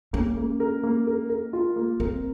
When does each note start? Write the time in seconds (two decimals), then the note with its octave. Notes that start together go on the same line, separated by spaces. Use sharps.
0.13 A#3 C#4
0.37 A#3
0.60 A#4
0.83 A#3
1.07 A#4
1.30 A#4
1.53 F4
1.76 A#3
2.00 C4 A#4